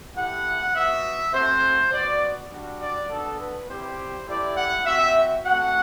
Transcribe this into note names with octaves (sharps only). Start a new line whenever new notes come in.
A3 E4 G4 F#5
B3 F#4 E5
A3 C4 F#4 C5
B3 F#4 D5
G3 D4 F#4
D5
B3 D4 F#4 A4
B4
G3 C4 E4 G4 C5
A3 E4 G4 D5
F#5
C4 F#4 E5
A3 C4 F#4 F#5